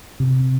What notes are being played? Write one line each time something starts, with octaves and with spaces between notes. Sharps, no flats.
C3